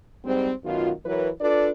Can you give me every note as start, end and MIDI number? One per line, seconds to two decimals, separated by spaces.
0.24 0.51 44
0.24 0.51 55
0.24 0.51 60
0.64 0.91 42
0.64 0.91 47
0.64 0.91 51
0.64 0.91 65
1.05 1.29 52
1.05 1.29 54
1.05 1.29 70
1.05 1.29 71
1.05 1.29 73
1.40 1.69 62
1.40 1.69 65
1.40 1.69 69
1.40 1.69 71
1.40 1.69 74